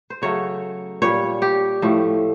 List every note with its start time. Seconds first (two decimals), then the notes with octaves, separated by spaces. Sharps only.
0.10 C5
0.22 C#3 F#3 A3 C#5
1.02 A#2 G3 C#5
1.42 G4
1.82 A2 F3 A3